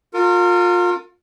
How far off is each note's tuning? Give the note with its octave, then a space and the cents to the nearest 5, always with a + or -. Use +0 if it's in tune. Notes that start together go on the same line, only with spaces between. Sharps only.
F4 +30 A#4 -30